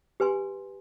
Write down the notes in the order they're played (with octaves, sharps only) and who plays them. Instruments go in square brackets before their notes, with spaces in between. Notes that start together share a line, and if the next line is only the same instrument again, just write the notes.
[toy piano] G4 B4 G#5 C6